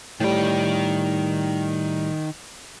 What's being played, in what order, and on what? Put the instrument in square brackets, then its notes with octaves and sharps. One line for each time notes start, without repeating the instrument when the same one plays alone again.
[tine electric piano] A2 G3 [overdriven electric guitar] D#3 G5